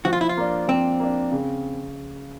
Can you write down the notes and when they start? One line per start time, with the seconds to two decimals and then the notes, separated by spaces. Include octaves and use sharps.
0.05 F3 F#4
0.13 F4
0.21 E4
0.29 F4
0.37 A#3 D4
0.68 F3 C4
1.00 A#3 D4
1.32 C#3